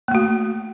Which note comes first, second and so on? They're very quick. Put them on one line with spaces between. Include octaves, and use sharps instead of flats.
A#3 A3 F#4